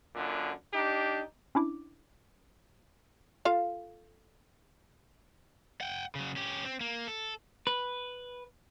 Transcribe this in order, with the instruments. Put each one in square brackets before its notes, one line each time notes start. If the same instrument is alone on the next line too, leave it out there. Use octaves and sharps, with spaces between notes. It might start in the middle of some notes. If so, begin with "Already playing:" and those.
[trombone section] F#2 A#2 D3
D4 D#4 G4
[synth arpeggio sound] C#4 D4 E4 D6
[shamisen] F4 A4 F5
[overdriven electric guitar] F#5 G5
C#3 F#3
C#4 G4
C4
A#3
A4
[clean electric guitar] B4